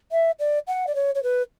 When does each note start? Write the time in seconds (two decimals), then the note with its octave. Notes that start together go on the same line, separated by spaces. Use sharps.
0.12 E5
0.39 D5
0.68 F#5
0.87 D5
0.95 C#5
1.15 C#5
1.23 B4